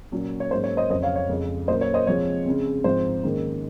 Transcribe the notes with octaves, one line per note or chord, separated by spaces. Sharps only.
A#2 F#3 C#4
C#5
G#2 F#3 A#3 C#4 C5
C#5
C5 D#5
F2 C#3 F#3 C#4 C5 D#5
C#5 F5
C#5
F2 C#3 G#3 C4
A#2 F#3 A#3 C#4 C5 D#5
C#5
C5 D#5
C3 F3 G#3 C4 C#5
C#3 G#3 C4
G#2 F3 C4 C5
G#2 D#3 A#3 C#4